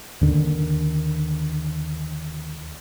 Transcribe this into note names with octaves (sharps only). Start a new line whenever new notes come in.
D#2 D3 D#3